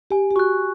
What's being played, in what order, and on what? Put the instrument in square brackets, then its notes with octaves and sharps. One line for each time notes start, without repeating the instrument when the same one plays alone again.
[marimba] G4 [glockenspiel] G#5
[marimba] G4
[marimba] F#4 [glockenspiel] C#6 F#6